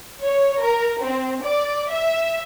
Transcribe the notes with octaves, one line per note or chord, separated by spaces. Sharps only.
C#5
A#4
C4
D5
E5